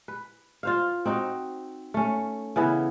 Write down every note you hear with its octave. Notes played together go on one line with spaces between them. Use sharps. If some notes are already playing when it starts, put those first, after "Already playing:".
B4
F4 C5 F5
C4 D#4 F#4
A3 C#4
C#3 E3 B3 E4